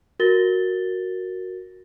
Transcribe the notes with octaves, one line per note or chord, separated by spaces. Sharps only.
F#4 A#4 A6 A#6 G7